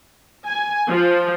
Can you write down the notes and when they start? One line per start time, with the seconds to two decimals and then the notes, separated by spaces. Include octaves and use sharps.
0.46 G#5
0.88 F3